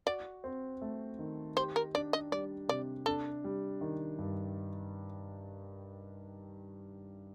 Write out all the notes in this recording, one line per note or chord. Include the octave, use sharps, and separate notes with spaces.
F#4 D5
C4
A3
D#3
G4 C5
A#4
D4 D5
D#5
G3 D5
C3 D5
D4 A4
G3
D#3
G2